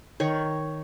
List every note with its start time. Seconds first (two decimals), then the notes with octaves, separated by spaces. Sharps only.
0.20 D#3 C#5